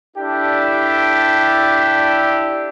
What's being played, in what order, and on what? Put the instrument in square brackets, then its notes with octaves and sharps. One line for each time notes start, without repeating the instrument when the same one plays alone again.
[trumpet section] D4 E4 G4 A4 D5